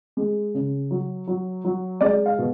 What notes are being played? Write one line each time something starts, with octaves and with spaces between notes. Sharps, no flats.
G#3
C#3
F#3
F#3
F#3
G#3 D5
F5
B2